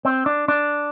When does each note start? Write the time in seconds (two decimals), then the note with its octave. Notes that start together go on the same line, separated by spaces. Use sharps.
0.05 C4
0.26 D4
0.48 D4